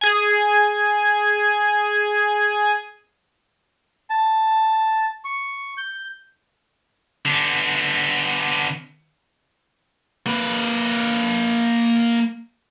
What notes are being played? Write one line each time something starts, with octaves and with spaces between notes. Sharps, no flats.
G#4 G#5
A5
C#6
G6
D3 B3
A#3 B4